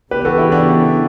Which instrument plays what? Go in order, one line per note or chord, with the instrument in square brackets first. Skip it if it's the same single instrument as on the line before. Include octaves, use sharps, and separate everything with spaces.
[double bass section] C#3 E3 B3 [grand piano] G4 B4
[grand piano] F#4 A4
E4 G4
D4 F#4